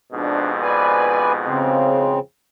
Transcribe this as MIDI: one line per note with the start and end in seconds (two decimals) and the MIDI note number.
0.13 2.16 41
0.13 2.16 44
0.13 2.16 47
0.13 0.51 62
0.62 1.32 71
0.62 1.32 74
0.62 1.32 80
1.46 2.19 49
1.46 2.19 60